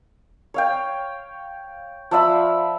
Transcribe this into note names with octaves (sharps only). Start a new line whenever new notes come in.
C#5 F5 G5
F3 D5 E5 B5